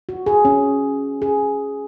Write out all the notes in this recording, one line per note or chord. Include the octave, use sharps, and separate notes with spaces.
F#4
G#4
C#4
G#4